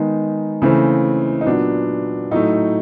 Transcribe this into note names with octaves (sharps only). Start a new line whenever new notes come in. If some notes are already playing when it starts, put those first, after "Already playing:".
Already playing: D#3 G#3 B3 D#4
C#3 E3 A3 C4
D#4
A#2 F#3 B3 D4
A2 F#3 A3 D#4